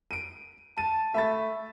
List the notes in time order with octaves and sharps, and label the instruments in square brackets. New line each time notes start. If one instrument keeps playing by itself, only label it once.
[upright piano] D7 D#7
[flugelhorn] A5 [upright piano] D#7
[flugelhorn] A3 [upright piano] E5 B5 A6